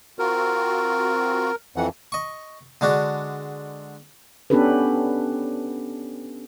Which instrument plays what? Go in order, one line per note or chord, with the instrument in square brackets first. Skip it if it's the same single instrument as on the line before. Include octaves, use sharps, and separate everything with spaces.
[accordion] C4 F4 F#4 [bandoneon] A#4
[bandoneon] F2 E3 [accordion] F#5
[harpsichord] D#5 C#6
D3 G#3 D4 F#4
[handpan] B3 C#4 D4 G4 A4 B4